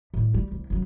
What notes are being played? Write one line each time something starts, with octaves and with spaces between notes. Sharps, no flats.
A2 G3
G3
C2
C#3 F#3